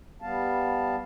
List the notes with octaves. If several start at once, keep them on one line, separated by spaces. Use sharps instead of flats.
G3 B3 F5 A5